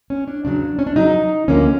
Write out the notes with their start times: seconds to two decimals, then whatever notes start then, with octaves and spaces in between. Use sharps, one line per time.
0.10 C#4
0.28 D4
0.45 E2 C#3 F#3 D4
0.79 C#4
0.87 D4
0.96 E2 C#3 F#3 D#4
1.48 D2 D3 F3 A#3 C#4